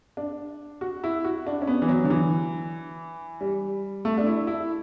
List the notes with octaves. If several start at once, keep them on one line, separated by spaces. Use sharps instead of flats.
D4
F#4
E4
F#4
D4
C#4
B3
E3
F#3
D3
E3
G3
A3
D4
E4
E4